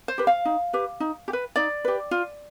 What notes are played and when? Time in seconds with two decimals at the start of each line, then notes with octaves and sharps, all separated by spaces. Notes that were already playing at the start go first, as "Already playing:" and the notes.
0.08 C5
0.18 G4 B4
0.27 F5
0.45 D#4
0.73 G4 B4
1.00 D#4
1.28 G4
1.33 B4
1.56 D#4 D5
1.85 G4 B4
2.11 F4